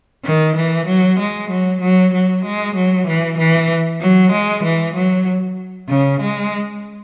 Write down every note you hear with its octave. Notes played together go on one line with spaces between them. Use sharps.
D#3
E3
F#3
G#3
F#3
F#3
F#3
G#3
F#3
E3
E3
F#3
G#3
E3
F#3
C#3
G#3